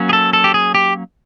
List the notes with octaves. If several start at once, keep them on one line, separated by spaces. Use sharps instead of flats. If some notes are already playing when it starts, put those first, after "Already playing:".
Already playing: F#3 A#3 C#4
G#4
A4
A4
G4
G#4
G4